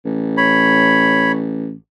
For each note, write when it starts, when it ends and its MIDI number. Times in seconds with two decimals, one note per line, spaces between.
0.05 1.74 33
0.37 1.32 73
0.37 1.32 83